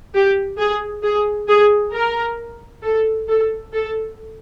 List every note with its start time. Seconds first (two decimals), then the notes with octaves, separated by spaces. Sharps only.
0.14 G4
0.58 G#4
1.03 G#4
1.48 G#4
1.93 A#4
2.83 A4
3.28 A4
3.73 A4